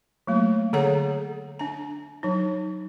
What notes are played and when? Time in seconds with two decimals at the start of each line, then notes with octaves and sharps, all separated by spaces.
0.27 F#3 A3 A#3
0.73 D3 G#4 A4 C#5 F#5 A#5
1.59 D4 A#5
2.23 F#3 D#4